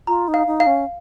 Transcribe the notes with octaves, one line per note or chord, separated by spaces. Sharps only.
F4 A#5
D#4
F5
D#4
F5
C#4